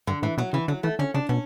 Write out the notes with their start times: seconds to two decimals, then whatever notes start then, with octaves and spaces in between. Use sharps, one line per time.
0.07 G2 D3
0.23 A2 E3
0.38 B2 F#3
0.53 C#3 E3
0.68 D3 F#3
0.83 E3 A3
0.99 D3 C#4
1.14 C#3 D4
1.29 B2 C#4